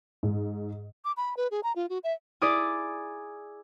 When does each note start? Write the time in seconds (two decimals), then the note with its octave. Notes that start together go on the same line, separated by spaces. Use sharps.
0.23 G#2
1.05 D6
1.17 B5
1.37 B4
1.51 G#4
1.63 A#5
1.76 F4
1.90 F#4
2.04 E5
2.42 E4 G#4 D5 D6 D#6